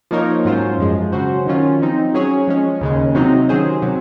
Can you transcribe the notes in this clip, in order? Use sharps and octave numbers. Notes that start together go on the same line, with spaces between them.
F3 A#3 D#4 A#4 C#5
G#2 F#3 C#4 F4 C5
F#2 F3 G#3
C#3 F#3 C#4 F#4 C5
D#3 F#3 C#4 F4
F3 C4 D#4
F#3 C#4 G#4 C#5
F3 G#3 C#4
D#2 C#3 G#3
C3 F#3 C4 D#4
D#3 F#3 C#4 G#4 C5
C3 F#3